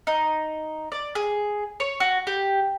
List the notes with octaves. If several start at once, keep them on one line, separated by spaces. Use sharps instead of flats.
D#4
D5
G#4
C#5
F#4
G4